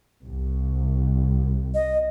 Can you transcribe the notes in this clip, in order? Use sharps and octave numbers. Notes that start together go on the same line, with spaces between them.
C2
D#5